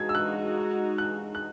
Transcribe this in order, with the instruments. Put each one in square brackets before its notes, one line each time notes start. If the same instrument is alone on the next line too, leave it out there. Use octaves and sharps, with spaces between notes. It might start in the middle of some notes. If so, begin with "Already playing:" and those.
Already playing: [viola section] G#3 D#4 F#4 [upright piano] G#6
[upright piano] E6
F#6
F#6
F#6